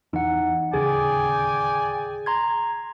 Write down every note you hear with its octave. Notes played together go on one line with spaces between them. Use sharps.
E2 E3 D#4 F#5
D1 D#2 C#3 G#4 D5 G5 G#5
A#5 C6 G#6